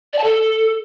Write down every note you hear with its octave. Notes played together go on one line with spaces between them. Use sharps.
D5
A5
A4